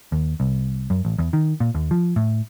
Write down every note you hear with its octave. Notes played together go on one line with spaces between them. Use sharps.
D#2
C2
F#2
A1
E2
D#3
A#2
D#2
F3
A2